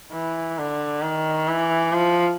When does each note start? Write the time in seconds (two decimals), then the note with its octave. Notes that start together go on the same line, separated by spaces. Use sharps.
0.12 E3
0.58 D3
1.02 D#3
1.48 E3
1.93 F3